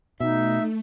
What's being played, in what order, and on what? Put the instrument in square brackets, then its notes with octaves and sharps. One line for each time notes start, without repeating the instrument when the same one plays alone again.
[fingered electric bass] B2 [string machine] A3 [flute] D#4 [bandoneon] E5